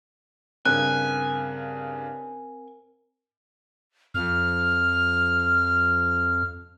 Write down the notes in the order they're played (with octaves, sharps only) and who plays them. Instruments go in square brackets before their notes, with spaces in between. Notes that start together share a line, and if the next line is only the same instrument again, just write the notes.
[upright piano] G2 C#3 [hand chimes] C4 A#4 [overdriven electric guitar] G#5 [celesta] F#6
[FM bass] F2 [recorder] F6